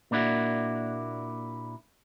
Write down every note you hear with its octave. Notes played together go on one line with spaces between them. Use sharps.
A#2 A#3 D4 E4 F#4